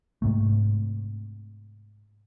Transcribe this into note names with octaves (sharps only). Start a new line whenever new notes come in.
G#2 C3 A3